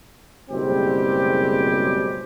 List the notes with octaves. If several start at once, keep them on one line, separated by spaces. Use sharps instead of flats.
F#1 B2 G3 G#3 C4 G4